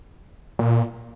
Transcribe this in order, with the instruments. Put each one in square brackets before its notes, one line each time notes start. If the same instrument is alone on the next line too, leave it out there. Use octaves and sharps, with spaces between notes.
[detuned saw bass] A#2